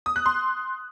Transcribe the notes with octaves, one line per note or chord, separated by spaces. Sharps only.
D#6
F#6
C6